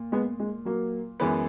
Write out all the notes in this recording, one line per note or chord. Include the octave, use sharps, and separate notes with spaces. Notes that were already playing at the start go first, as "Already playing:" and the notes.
Already playing: A#2
G#3 B3
G#3
F#3 A#3
F#2 E3 G#3 B3